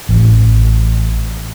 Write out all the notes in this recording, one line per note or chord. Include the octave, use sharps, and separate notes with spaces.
A1